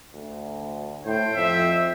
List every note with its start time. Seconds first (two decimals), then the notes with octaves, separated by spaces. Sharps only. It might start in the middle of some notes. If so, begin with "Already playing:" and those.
0.14 D2
1.05 A2 C5 G5
1.36 F2 E5